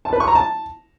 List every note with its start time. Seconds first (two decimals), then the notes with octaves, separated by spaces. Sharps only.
0.05 A5
0.13 B4
0.20 C#6
0.28 A#5
0.35 A5